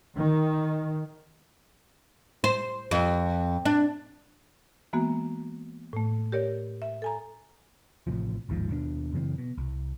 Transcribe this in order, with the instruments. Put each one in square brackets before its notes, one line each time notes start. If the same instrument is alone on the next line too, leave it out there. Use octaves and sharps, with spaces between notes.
[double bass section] D#3
[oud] C5
F2
D4
[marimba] E3 G#3 A#3 B3 F#4
A2 A3
G4 A#4 C#5 D5
E5
A4 G#5 A#5
[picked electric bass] A1 A2 C3 F3
A1 D#2 G#2 F3
D#2 B2 D4
F#2 C#3 E3 C4
B2
C2